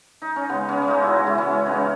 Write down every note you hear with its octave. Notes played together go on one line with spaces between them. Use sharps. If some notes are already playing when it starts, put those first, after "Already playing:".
D#4
C#4
C#3 G#3 B3
C#4
C#4
C#3 G#3 D#4
E4 F#4
C#3 E3 G#3 E4
C#4
B3
C#3 E3 G#3 D#4
C#4